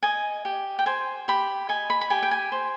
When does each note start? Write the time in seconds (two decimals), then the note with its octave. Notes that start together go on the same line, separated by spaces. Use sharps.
0.03 D#5 G#5
0.45 G4
0.79 G5
0.86 C5 G#5
1.28 G4 B5
1.69 D#5 G#5
1.90 B5
2.01 B5
2.10 G4 G#5
2.23 G5
2.31 G#5
2.52 C5